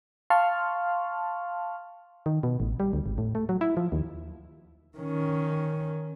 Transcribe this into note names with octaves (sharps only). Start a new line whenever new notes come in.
F5 A5 C6 C#6 F6
D#3
B2
A1
G3
D2
G#1
A2
A3
F#3
E4
F3
D#2
D#3 C#4